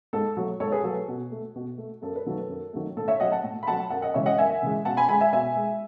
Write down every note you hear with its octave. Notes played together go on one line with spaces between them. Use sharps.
G#2 A4
F#3 A3
G#2 A4 C#5
G#4 B4
F#3 A3 A4
B2
A3
B2
A3
F#2 A4
B4
D#3 F#3 A3 A4
F#2
D#3 F#3 A3
A2 A4
C#5 E5
F#3 A3 D#5 F#5
F#5 A5
A2
B5
F#3 A3 F#5 A5
F#2 F#5 A5
D#5 F#5
C#3 E3 G#3 C#5 E5
D#5 F#5
F#2 E5 G#5
C#3 E3 G#3
B2 F#5 A5
G#5 B5
G#3 G#5 B5
E5 G#5
B2 E5 G#5
G#3